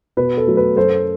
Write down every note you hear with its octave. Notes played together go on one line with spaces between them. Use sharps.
B2 B4
A4
F#3 A3
B4
F#2 A4 C5